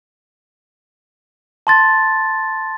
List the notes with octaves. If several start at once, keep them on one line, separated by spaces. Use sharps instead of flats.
A5 C6 A6